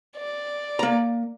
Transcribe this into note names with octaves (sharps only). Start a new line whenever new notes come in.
D5
A#3 A#5